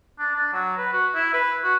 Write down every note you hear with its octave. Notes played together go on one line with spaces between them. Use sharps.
D4
D4
F#3
B4
F#4
E4
B4
F#4